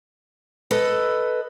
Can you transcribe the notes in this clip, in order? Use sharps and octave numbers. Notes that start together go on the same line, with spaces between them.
A4 B4 D#5